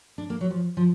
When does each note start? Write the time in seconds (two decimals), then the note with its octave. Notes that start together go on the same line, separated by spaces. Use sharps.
0.18 D4
0.30 A#3
0.41 F#3
0.50 F3
0.77 F3